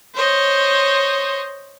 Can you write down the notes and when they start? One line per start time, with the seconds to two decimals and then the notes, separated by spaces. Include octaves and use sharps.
0.14 C5 C#5 D#5